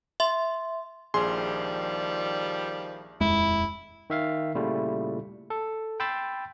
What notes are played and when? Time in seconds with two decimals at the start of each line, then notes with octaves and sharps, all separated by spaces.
0.20 E5 C6
1.14 A#1 D#3 F3 G3 G#4 C6
3.21 D#1 F2 G#3 E4
4.10 D#3 E5 F5
4.55 A#2 C#3 G3 A3 E4 F4
5.50 A4
6.00 G5 B5 C6 E6 A6